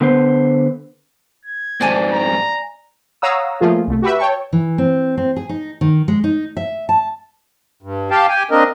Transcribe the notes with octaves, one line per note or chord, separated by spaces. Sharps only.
D3 B3 B4 C5
G#6
F2 G#2 C4 D5 G#5 A5
A#5
C#5 F5 F#5 A#5 D#6 E6
F3 A3 A#3 F4 G#4
C2 A3
F#4 G4 B4 E5
C#5 G5 A5 C#6
E3
C4
C4
G#4
D#4
D#3
G#3
D#4
E5
A5
G2
G4 F5 G5 A5
G4 G5 G#5
A#3 C4 D4 A#4 D#5